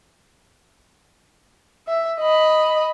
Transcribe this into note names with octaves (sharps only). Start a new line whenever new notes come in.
E5
D#5 B5